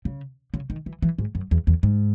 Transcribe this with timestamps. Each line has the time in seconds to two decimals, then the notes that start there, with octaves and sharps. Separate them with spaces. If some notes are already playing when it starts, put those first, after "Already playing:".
0.05 C#3
0.54 C#3
0.70 D#3
0.86 E3
1.02 E3
1.18 G#2
1.35 F#2
1.51 E2
1.67 E2
1.83 G#2